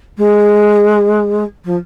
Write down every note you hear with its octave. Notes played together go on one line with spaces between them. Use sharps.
G#3
F3